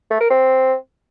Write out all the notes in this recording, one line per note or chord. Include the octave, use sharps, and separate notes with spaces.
A3
A#4
C4